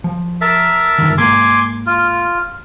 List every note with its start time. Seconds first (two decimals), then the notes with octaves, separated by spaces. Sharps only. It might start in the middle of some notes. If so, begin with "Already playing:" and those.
0.04 F3
0.41 A#4 E5 A5
0.98 G2 D3 D#3
1.18 G#2 A#3 G#5 C6 D6
1.86 F4